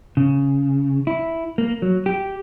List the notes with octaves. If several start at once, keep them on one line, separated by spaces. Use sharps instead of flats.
C#3
E4
A#3
F#3
G4